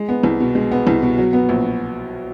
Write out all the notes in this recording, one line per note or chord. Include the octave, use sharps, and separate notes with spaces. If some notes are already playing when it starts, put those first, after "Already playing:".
Already playing: G#3
B3
C2
B2
G#3
B3
C2
B2
F#3
B3
A#1